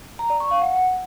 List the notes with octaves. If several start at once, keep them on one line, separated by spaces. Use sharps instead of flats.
A#5
D5
C#6
F5
F#5